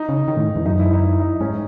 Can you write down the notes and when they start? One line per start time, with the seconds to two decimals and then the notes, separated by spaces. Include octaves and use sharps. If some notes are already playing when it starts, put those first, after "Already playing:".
Already playing: D#4
0.09 C#3
0.28 D#3
0.37 A2
0.46 G#2
0.56 E2
0.65 F#2 D#4
0.79 E4
0.93 D#4
1.06 E4
1.20 D#4
1.41 G#2 C#4